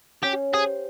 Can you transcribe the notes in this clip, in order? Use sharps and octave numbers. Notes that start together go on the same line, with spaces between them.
C#4 G4
G4 G#4 C5